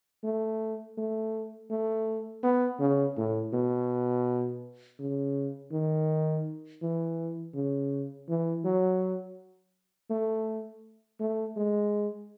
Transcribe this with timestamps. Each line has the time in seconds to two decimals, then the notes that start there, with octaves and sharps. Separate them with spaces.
0.24 A3
0.98 A3
1.70 A3
2.43 B3
2.80 C#3
3.17 A2
3.53 B2
5.00 C#3
5.72 D#3
6.82 E3
7.55 C#3
8.29 E3
8.65 F#3
10.10 A3
11.20 A3
11.57 G#3